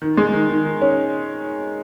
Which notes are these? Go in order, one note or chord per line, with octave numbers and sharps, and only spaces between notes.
D#3
G#3
D#3
D#3
D#3
C#4